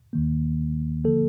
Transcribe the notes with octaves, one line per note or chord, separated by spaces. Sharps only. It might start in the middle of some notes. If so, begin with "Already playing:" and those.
D#2 D#3 A#3
D3 F3 A#3 A4